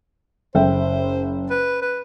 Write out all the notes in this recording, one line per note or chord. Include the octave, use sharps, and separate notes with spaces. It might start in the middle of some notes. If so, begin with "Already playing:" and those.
F#1 C5 E5 G5
B4
B4